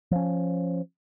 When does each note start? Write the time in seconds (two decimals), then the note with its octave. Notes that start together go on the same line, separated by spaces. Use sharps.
0.11 F3 C#4